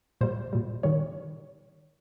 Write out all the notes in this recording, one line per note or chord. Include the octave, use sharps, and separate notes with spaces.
A#2 G3 C5
A#2 G3
D#3 G3 C#5